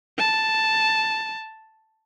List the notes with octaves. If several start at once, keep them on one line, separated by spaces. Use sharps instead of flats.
A5